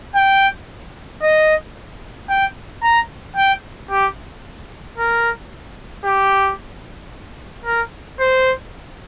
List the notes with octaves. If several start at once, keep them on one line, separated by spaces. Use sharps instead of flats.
G5
D#5
G5
A#5
G5
G4
A#4
G4
A#4
C5